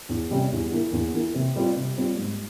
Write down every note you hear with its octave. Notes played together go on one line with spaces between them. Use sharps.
E2
C3 G3 C#4 G4
E2
E3 A#3
E2
E3 A#3
C3
G3 C4 F4
C3
G3 C4 F4
G#2